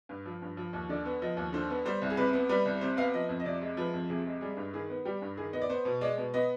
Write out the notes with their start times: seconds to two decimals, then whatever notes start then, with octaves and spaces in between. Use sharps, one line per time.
0.09 G2
0.26 F3
0.42 G2
0.57 F3
0.73 D#2
0.89 D3 D5
1.05 B3
1.22 F3 D#5
1.37 D#2
1.53 D3 C5
1.70 B3
1.85 G3 C5
2.02 C2
2.10 G#4
2.17 C3 B4
2.33 B3
2.49 G3 B4
2.65 C2
2.81 C3 C5
2.97 B3 F5
3.14 F3 D#5
3.29 F2
3.40 D#5
3.45 C3 D5
3.61 G#3
3.77 F3 B4
3.94 F2
4.09 C3 G#4
4.26 G#3
4.41 G3 G#4
4.57 G2
4.74 D#3 G#4
4.90 B3
5.05 G3 G4
5.22 G2
5.37 D#3 G#4
5.53 B3 D#5
5.62 D5
5.69 B3 C5
5.85 B2
6.01 G#3 D5
6.18 B2
6.34 B3 D#5